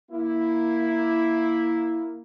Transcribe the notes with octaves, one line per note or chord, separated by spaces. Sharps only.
A#3 E4